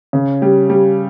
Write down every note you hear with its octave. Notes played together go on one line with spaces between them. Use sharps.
C#3
G3
G3